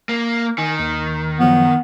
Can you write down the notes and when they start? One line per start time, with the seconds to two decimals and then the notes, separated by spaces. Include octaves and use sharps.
0.09 A#3
0.58 D#3 G#5
0.79 D#2
1.39 F#2 F3 F#3 B3